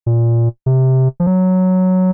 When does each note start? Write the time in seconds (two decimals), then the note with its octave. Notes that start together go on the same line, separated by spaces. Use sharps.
0.06 A#2
0.66 C3
1.20 F3
1.27 F#3